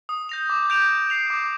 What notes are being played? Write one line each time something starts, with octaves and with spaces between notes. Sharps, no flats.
D#6
G6 A#6 F7
D6
G6 D7 F7
G6
C7 F7
D6